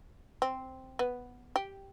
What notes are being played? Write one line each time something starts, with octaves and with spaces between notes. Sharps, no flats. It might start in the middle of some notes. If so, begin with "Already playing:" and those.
C4
B3
G4